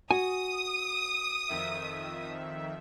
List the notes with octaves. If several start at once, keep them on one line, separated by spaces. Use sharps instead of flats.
F#4 G#5 D#6
F2 D#3 E5